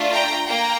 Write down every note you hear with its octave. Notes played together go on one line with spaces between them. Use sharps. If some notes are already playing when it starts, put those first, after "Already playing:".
Already playing: A3 D4 F4
G5 A#5
A#3 G5 A#5